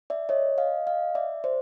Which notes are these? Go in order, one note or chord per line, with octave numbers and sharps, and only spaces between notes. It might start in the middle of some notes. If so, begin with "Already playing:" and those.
D5 E5
C#5 D#5
D#5 F5
D#5 F5
D5 E5
C5 D5